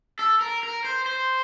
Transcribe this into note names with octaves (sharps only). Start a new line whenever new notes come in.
A4
A#4
A#4
C5
C5